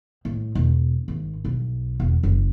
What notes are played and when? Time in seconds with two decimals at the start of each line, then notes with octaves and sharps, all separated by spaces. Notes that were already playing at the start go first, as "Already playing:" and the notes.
0.25 A2
0.55 E1
1.08 G#1
1.45 B1
2.00 E1
2.23 F#1